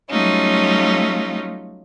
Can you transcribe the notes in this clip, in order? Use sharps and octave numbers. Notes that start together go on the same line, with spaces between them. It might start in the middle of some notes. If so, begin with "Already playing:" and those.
F#3 G3 A3 C#4 D#4 F4